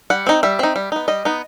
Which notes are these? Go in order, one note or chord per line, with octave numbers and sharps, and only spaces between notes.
G3 F#5
C4 D#4
G3 E5
C4 D#4
G3
B3 D#4
G3 D#5
B3 D#4